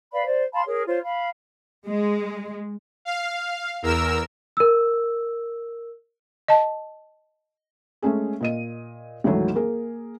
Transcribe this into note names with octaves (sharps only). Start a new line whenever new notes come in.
B4 D5 F5 B5
C5 D5
F5 A5 B5 C6
G#4 A#4 C#5
F4 C5 C#5
F5 B5
G#3
F5
E2 A#4 E6
A#4 E6
D#5 A5
G#3 A3 C#4 G#4
A#2 D#5 D#7
D2 G#2 D#3 E3 F#3 A3
A#3 G#4 A#4